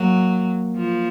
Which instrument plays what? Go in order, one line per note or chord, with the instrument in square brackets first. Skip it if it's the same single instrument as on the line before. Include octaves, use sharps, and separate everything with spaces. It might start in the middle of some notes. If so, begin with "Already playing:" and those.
Already playing: [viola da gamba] F#3 [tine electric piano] A#3
[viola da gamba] F3